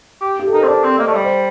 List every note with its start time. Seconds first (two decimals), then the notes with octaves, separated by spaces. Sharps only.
0.21 G4
0.40 G4
0.47 A4
0.53 D#4 A#4
0.61 C5
0.63 C4
0.68 D4 D5
0.84 C4
0.98 A#3 D#5
1.07 A3
1.11 G3 D5
1.24 C5